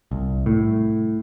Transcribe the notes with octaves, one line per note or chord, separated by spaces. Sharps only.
C2
A2